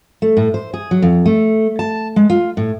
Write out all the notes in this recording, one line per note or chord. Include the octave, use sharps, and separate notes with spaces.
A3
A2
C5
G#4
F#3
F2
A3
A5
G#3
F4
A2